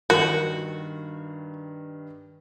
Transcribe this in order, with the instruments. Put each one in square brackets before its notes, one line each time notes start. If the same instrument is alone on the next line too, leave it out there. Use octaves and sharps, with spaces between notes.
[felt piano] G2 D#3 [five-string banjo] F#4 [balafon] A#4